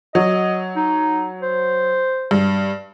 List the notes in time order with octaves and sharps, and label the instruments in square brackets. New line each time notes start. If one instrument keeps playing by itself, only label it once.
[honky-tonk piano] F#3 [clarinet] D#5
[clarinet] D#4
C5
[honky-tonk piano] G2